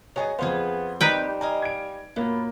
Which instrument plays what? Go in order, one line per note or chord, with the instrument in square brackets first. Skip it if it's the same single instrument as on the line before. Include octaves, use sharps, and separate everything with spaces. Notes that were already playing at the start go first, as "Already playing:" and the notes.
[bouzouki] F#3 B3 G#4 [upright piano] C#5 D#5 G#5
[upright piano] F2 C5 [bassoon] B3 [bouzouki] G#4 B4 F5
[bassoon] G3 [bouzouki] A#3 C4 G4 [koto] D#4 B4 G5
[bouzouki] D#5 F5 G#5 [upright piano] A#5
[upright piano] G#6 D7
[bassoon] F#2 [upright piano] A#2 A#3 [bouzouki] B3